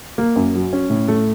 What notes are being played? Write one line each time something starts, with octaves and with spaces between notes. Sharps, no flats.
A#3
F#2
F#3
C#4
A2
A3